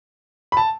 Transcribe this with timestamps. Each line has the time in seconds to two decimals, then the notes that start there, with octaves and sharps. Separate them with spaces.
0.52 B5
0.57 A5